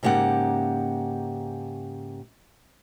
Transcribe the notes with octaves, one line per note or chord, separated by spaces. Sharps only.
G#2 C#3 A#3 G4 F#5